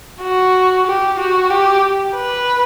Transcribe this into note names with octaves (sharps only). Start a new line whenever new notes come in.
F#4
G4
F#4
G4
B4